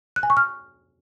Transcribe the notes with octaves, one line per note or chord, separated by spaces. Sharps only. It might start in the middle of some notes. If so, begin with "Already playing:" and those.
F#6
G#5
C#6
F6